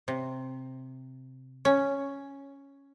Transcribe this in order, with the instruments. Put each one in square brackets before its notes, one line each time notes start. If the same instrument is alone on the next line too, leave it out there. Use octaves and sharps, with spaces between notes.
[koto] C3
C#4